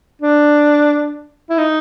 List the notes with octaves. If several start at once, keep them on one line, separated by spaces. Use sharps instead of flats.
D4
E4
D#4